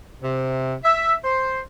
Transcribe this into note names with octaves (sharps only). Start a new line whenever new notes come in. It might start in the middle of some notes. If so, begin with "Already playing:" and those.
C3
E5
C5